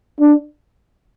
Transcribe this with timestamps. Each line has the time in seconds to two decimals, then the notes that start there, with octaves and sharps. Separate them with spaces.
0.20 D4